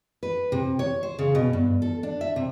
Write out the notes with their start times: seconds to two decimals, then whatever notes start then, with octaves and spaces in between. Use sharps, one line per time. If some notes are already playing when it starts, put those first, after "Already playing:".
0.23 B4
0.52 C3
0.79 C#5
1.03 C5
1.19 C#3
1.35 B2
1.53 G2
1.82 A4
2.03 D4
2.21 E5
2.36 C3